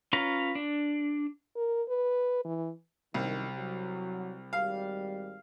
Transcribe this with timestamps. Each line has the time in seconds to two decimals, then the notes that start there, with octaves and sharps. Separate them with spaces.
0.13 C#4 F4 B4 A#5
0.55 D4
1.56 A#4
1.89 B4
2.45 E3
3.14 C2 F#2 D#3
3.58 F#3
4.53 G#1 G3 F5